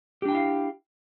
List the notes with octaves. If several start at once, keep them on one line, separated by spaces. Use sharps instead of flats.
D4 E4 G4 F5 G5